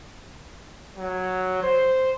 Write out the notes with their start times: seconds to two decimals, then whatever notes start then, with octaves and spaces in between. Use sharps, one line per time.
0.97 F#3
1.63 C5